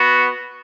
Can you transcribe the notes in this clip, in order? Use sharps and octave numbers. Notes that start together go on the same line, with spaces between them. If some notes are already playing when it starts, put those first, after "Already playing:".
Already playing: B3 F#4